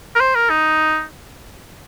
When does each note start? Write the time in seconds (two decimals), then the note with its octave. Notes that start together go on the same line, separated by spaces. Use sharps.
0.15 A#4
0.21 C5
0.36 A#4
0.50 D#4